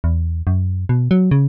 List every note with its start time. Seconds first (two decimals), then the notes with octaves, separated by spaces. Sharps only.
0.04 E2
0.47 F#2
0.89 B2
1.11 F#3
1.31 C#3